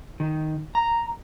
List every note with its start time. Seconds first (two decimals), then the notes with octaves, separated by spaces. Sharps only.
0.20 D#3
0.75 A#5